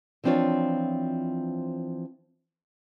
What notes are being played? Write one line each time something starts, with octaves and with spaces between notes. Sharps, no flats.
E3 F3 C4 D4 F4 C#5